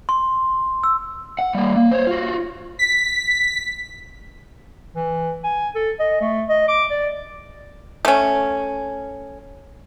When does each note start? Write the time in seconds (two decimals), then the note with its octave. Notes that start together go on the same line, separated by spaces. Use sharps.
0.09 C6
0.84 E6
1.39 F#5
1.55 G3 A#3
1.76 A#3
1.91 C5 C#5
2.07 F4 F#4
2.79 B6
4.96 E3
5.44 G#5
5.75 A4
5.99 D#5
6.21 A3
6.49 D#5
6.68 D6
6.90 D5
8.05 A3 C#4